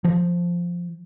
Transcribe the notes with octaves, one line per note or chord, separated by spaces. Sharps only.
F3